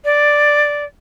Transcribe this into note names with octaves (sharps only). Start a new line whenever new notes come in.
D5